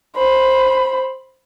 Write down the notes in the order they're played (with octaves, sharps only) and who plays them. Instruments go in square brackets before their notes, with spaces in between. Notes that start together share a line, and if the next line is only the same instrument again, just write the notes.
[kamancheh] C5 B5